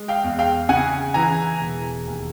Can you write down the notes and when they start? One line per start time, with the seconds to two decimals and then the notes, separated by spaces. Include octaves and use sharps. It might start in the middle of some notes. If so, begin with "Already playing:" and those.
Already playing: G#3
0.08 F5 G5
0.24 E2
0.39 F5 G5
0.69 C#3 F#5 G#5
1.14 E3 G#5 A#5
1.60 E1
2.06 D#2